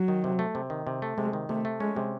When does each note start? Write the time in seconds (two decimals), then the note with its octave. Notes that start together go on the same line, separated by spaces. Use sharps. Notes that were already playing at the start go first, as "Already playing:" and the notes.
Already playing: F#3
0.08 D#3
0.24 C3
0.39 A3
0.55 C3
0.70 D#3
0.87 C3
1.02 A3
1.17 C3 G#3
1.33 D#3
1.49 C3 A3
1.65 A3
1.80 G#3 C#4
1.96 C3